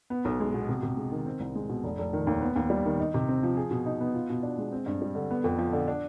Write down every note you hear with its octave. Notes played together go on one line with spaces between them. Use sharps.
B3
B1
G#3
B2
C3
C3
G#3
D#3
C4
C2
G#3
B2
F1
F1
D#3
D#2
B3
D#2
G3
D#3
D#4
C3
C4
F3
G#4
B2
D#4
B3
F4
B2
D4
G#3
C4
G2
G3
D3
B3
F2
F3
D3
D4